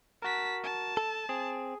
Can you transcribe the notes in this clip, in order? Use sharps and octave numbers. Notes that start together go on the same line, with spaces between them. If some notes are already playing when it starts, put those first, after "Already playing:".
F#4 A#4 A5 B6
A5
A4
C4 G#4